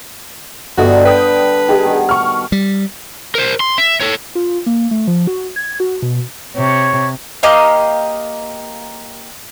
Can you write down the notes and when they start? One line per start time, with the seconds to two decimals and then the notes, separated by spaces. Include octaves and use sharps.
0.78 G1 D3 G3 F#4 A4 D#5
1.05 B4 G5 D#6 G6
1.69 G4 G#4 D#5
1.84 B2 D#3
2.09 C#6 F6
2.52 G3
3.35 A#4 C5
3.60 C6
3.78 E5
4.01 A4 C#5
4.35 F4
4.66 A#3
4.91 A3
5.07 F3
5.27 F#4
5.56 G#6
5.80 F#4
6.02 B2
6.55 C3 C#5
7.43 A#3 G4 D#5 F5